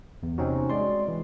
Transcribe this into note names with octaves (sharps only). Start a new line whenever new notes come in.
E2
C3 C4 C#4 D#4 F#4
G#3 D5 C6
E3